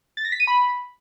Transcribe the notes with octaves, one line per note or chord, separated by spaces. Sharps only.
A6
A#6
B6
D#7
B5